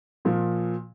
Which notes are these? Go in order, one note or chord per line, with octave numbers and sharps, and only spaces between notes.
A#2 F3